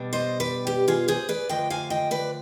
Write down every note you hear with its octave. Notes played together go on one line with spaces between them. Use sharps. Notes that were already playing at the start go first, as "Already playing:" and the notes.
Already playing: B2 G3 D4
C5 D#5
B4 D5
G4
F4 G#4
G#4 C5
B4 D5
D2 D3 F3 D#5 G5
F5 G#5
D#5 G5
B4 D5